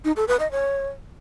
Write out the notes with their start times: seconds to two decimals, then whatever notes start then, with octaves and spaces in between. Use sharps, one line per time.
0.05 D#4
0.16 A4
0.28 B4
0.39 D#5
0.51 C#5